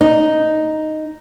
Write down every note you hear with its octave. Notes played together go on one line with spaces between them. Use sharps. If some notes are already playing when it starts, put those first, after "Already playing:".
D#4